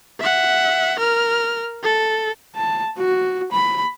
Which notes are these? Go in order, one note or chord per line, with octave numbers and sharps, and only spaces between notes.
E5 F#5
A#4 F6
A4
A5
F#4
B5